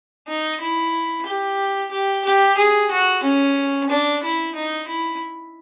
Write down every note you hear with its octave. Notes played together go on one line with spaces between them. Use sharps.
D#4
E4
G4
G4
G4
G#4
F#4
C#4
D4
E4
D#4
E4